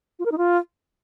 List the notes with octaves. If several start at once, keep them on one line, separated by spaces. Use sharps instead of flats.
F4
A#4
D#4
F4